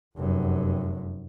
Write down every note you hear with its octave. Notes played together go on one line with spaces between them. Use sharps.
F1 F#2